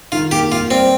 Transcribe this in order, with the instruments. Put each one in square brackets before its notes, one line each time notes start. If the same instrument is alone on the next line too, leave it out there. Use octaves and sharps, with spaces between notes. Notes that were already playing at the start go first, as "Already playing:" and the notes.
[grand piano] D#3 [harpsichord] F4
[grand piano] A#3 [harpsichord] G4
[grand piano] A#3 [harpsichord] F4
[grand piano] G3 [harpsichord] C4